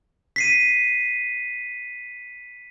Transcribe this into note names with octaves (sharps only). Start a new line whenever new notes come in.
B6 C7 D#7